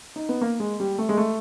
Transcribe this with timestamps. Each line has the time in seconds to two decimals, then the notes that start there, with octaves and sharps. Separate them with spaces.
0.16 D#4
0.29 B3
0.41 A#3
0.60 G#3
0.80 G3
0.98 A3
1.09 G#3
1.17 A3